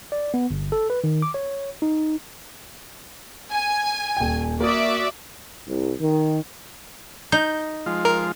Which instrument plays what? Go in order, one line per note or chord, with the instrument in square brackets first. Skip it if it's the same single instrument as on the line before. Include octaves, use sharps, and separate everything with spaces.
[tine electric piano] D5
B3
G1
A4
B4
D#3
D6
C#5
D#4
[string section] G#5
[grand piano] D#1 G5
[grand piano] A#3 D#6 [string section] F#4 D5 E5
[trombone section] C2
D#3
[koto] D#4 [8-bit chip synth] G6
[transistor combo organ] F3 G#3 F4
[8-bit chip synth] A#4